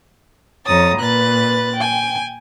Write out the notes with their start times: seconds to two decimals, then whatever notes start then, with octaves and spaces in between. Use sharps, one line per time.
0.65 F2 C#5 A#5 D#6 A6
0.98 A#2 B4 F#6 A6
1.76 G5 G#5